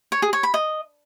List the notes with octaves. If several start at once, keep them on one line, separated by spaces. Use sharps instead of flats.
C#5
G#4
C#5
B5
D#5